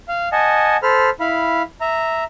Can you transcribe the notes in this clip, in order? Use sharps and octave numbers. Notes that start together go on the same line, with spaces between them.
F5
D#5 F#5 G#5 A5
A4 C5 B5 F6
E4 F5 B5
E5 A#5